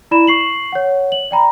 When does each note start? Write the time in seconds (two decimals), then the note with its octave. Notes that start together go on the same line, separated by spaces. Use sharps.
0.11 E4 D5 B5 E7
0.27 C#6 C7 F#7
0.72 C#5 F#5
1.12 F#7
1.31 D5 G5 A#5 B5